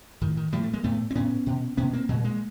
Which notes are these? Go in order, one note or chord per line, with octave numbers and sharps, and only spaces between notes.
A2 D#3
D#3
A2 F3 G3
A3
G#3 A#3
A2 A3 B3
C4
A2 B3 C#4
B2
B2 B3 C#4
A#3 C4
A#2 F#3 G#3
G#3 A#3